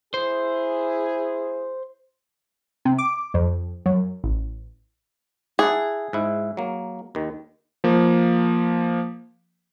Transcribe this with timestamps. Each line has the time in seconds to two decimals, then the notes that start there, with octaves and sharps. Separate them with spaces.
0.14 E4 G#4 C5
2.85 C3
2.98 D6
3.34 F2
3.86 F#2
4.24 A1
5.59 E4 G#4 F#5 A5
6.13 G#2 E4
6.57 F#3 A#3
7.15 D#2 D#3
7.84 F3 A#3